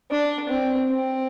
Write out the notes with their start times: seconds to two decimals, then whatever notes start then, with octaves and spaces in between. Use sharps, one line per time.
0.10 D4
0.49 C4
0.89 C4